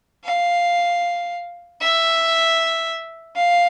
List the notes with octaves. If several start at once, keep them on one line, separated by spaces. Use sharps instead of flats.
F5
E5
F5